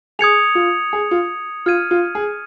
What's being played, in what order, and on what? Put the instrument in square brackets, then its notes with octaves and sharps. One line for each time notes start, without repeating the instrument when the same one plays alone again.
[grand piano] G#4 [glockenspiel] D#6 G#6 C#7 F7
[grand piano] F4
G#4
F4
[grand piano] F4 [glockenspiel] F6 G#6 D#7
[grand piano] F4
G#4